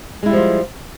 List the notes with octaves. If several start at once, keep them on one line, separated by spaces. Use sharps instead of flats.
F3 G3 G#3 E4 F4